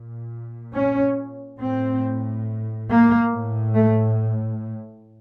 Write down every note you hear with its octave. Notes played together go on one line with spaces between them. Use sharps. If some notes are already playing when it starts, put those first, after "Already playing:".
Already playing: A#2
C#4
A2 C4
A#3
A2
A3